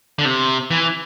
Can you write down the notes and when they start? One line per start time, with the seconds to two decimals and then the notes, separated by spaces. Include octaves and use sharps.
0.19 D3
0.25 C3
0.71 E3